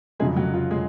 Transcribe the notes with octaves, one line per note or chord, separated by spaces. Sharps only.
F1 F2 C#3 F#3 G#3 G#4
F#3 F#4
F4
G#3 G#4